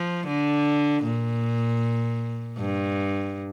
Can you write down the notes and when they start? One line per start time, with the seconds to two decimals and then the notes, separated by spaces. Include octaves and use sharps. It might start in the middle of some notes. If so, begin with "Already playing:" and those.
Already playing: F3
0.27 D3
1.03 A#2
2.58 G2